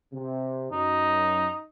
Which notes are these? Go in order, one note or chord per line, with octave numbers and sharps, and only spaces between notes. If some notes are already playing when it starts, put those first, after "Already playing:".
C3
F#2 D#4